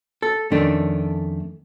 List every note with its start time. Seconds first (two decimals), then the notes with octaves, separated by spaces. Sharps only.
0.22 A4
0.51 F2 D#3 A3 C#4 D4